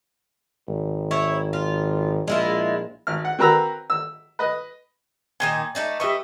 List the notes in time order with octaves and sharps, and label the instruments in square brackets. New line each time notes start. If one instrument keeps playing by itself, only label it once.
[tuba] G#1
[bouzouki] E4 C#5
F4
[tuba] A#1 [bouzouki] G#3 E4 F4
[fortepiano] G#1 F6
F#5
C4 F#4 A#4 B4 A#5 E6
E6
B4 D#5
[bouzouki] A#2 D#3 D#4 [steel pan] G5 G#5
[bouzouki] A3 D#4 D5
[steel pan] G4 E5 C#6 [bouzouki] B4 D#5